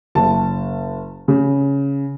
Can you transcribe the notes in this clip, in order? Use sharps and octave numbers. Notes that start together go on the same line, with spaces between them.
F#1 A5
C#3